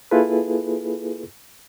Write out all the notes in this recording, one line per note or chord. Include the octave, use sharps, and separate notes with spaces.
A#3 E4 F4 G#4 A4 B4